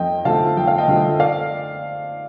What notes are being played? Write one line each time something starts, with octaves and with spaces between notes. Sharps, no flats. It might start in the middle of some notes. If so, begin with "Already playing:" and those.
Already playing: F2 D#5 G5
D3 F3 A3 F5 A5
F2 G5
F5
D#5 G5
D3 F3 A3
D5 F5